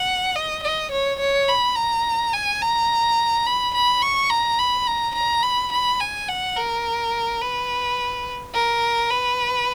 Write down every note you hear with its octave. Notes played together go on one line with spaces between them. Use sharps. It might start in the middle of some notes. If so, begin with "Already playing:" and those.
Already playing: F#5
D#5
D#5
C#5
C#5
B5
A#5
G#5
A#5
B5
B5
C#6
A#5
B5
A#5
A#5
B5
B5
G#5
F#5
A#4
B4
A#4
B4